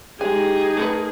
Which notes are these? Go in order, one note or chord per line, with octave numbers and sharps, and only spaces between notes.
G#3 D#4 G4 G#4 G#5
A3 A#4 B4